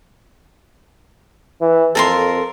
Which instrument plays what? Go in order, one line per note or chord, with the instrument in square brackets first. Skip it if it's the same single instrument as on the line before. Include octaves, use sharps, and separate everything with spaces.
[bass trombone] E3
[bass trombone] F2 [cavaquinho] A4 A#4 C6